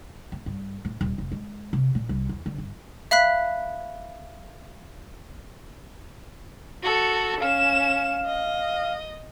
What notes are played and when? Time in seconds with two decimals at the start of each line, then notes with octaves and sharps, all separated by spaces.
0.32 A#3
0.46 G2
0.85 A2
1.01 D#1
1.18 F1
1.32 G#3
1.73 C3
1.95 A#2
2.09 C2
2.29 E2
2.46 D3
2.58 G1
3.11 E5 F5 B5 F#6 B6
6.83 F#4 A4
7.41 C#4 F5 E7
8.26 D#5